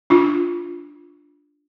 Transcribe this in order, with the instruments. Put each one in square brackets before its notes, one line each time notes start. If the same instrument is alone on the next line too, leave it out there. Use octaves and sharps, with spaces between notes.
[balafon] D4 F4